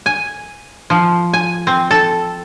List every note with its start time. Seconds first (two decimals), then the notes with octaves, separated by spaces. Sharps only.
0.06 G#5
0.90 F3
1.33 G#5
1.67 C4
1.91 A4